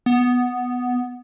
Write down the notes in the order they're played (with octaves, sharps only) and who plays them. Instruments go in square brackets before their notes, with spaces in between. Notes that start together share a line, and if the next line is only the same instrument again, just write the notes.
[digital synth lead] B3